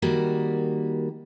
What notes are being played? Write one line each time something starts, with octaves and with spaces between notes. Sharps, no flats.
D#3 G3 A#3 F#4